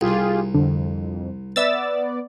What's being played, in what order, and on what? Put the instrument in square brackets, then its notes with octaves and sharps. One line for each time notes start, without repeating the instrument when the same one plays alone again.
[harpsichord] C2 [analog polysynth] F4 G4 G#4
[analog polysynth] F2 [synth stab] D3
[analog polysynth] B3 D5 [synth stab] E5 E6 A6